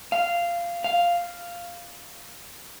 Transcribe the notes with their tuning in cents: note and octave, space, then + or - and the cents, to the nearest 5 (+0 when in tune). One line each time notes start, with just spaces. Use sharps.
F5 -15
F5 -5